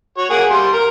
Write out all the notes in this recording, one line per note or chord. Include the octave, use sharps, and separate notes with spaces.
F#4 C#5
A#3 G#4 F#5
G3 C6
A#4